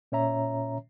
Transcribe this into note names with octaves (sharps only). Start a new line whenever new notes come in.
A#2 C#4 C#5 E5 A#5